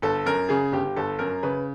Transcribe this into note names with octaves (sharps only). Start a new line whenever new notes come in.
G1 A4
F#2 A#4
C#3 G#4
G1 G4
G1 A4
F#2 A#4
C#3 B4